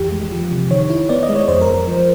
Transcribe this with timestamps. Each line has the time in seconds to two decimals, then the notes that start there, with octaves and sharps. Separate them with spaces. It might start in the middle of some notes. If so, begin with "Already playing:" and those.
Already playing: F2 E3 G4
0.12 G#3
0.31 F3
0.51 C3
0.71 D#3 C#5
0.90 E4
1.09 B3 D5
1.23 D#5
1.29 G#3
1.35 C#5
1.48 F2 C5
1.61 A#4
1.68 F2
1.74 A#4
1.88 F3